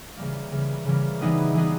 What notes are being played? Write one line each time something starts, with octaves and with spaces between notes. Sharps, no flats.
C#3 E3 G3 A#3
C#3 E3 G3 A#3
C#3 E3 G3 A#3
E3 G3 B3 D#4 G#4
E3 G3 B3 D#4 G#4